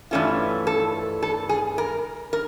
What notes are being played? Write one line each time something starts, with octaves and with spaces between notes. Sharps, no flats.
G2 E3 A3 C#4 F4
A4
A4
G#4
A#4
A#4